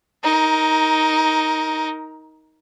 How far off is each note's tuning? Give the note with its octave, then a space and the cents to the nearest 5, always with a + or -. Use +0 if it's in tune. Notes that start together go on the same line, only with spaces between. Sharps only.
D#4 +15 A#4 +0